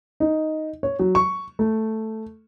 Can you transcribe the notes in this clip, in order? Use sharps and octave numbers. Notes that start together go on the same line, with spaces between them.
D#4
C#5
F#3
C#6
A3